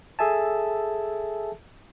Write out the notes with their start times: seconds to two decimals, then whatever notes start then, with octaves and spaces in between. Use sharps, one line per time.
0.19 G#4 A4 E5 G#5 A5